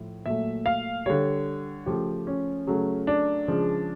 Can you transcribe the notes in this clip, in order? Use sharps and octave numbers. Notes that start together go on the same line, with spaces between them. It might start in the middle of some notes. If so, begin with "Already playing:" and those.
Already playing: A2 F3
A#2 F#3 A3 E5
F5
D3 G3 C#5
C#3 F3 A3 G4
C#4
C#3 F#3 A3
D4
C#3 F3 G#3